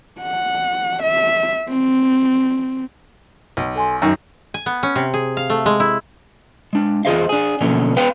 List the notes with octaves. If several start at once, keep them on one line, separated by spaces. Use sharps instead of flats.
F#5
E5
C4
B1
A4 G#5 C6
F#2 D#3 A#4 A#6
G#5
B3
C#4
C3
G#4
F5
A3
G#3
E4
G#3 D4
E2 F4 G#4 C5 D#5 F5
D4 G#4
B2 D3 F3 F#3 A#3 C#4
B3 B4 F5 G5